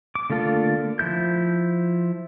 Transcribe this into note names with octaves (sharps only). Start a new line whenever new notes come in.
D6
D3 A3 A#3 F4 A4
F3 E4 G6